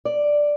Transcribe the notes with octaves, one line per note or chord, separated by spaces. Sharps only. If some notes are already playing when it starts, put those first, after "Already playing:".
D5